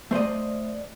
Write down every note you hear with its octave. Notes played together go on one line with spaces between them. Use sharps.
A3 C5 D5 D#5